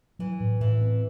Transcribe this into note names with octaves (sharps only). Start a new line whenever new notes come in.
E3 F#3
A2
A2 E3
C4